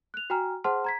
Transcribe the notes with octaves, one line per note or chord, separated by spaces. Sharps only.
F#6 F7
F#4 G5 G#5 A#5 F6
G#4 C5 F#5 A5 C6 F6
A#5 G#6 B6